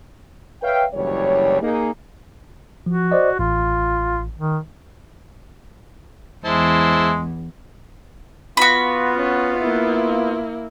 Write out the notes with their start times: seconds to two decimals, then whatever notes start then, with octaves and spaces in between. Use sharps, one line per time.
0.62 B4 C#5 E5 F5 G5
0.93 F#1 D2 E3 G3 C#5
1.62 A#3 D#4 G#4
2.86 F3 F#4
3.11 C5 D5 D#5
3.39 A1 F4
4.38 D#3
6.45 E2 G#3 E4 C5 A5
8.57 B3 F4 F#4 B5
9.15 C#4
9.59 A#3 E4